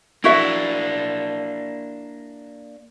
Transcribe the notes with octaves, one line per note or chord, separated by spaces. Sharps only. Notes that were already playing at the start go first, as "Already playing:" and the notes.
A#3 D4 E4 F#4 E5